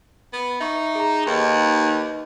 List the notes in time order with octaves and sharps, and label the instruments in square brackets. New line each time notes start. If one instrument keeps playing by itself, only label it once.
[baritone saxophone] B3
[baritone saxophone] D#4 [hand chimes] E5 C#6
[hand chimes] G#4 A#5
[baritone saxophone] D#2 [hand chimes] D#4 B4 D#5